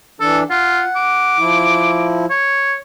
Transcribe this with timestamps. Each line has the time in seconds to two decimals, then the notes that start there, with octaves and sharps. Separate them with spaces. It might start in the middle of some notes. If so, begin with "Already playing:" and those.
0.21 E3 D4 A4
0.51 F4 F#5
0.96 D6
1.38 F3 E4
2.31 C#5